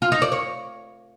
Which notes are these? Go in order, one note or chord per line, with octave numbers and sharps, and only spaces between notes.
F4
D#4
D5
C#5